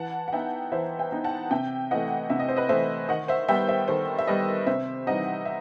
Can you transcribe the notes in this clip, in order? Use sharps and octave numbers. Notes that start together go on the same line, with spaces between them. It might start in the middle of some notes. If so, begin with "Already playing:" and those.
Already playing: E3 F#5 A5
F#5
B3 D#4 E5 G5
E3 C5 E5
E5 G5
B3 D#4
F#5 A5
C3 E5 G5
E3 A3 D#5 F#5
C3 E5
D#5
C5
B4 D#5
E3 A3 C5 E5
D#3 D#5 F#5
C5 E5
G3 B3 E5 G5
C5 E5
D#3 A4 C5
E5
G3 B3 B4 D#5
C3 C5 E5
E3 G3 C4 D#4 D#5 F#5
E5